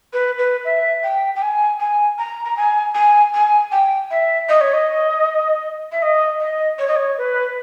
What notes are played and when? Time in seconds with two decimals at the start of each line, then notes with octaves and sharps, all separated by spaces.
0.13 B4
0.38 B4
0.65 E5
1.04 G5
1.35 G5
1.42 G#5
1.80 G#5
2.18 A#5
2.45 A#5
2.57 G#5
2.95 G#5
3.34 G#5
3.72 G5
4.11 E5
4.49 D#5
4.61 C#5
4.73 D#5
5.92 E5
6.02 D#5
6.40 D#5
6.79 C#5
6.88 D#5
6.96 C#5
7.18 B4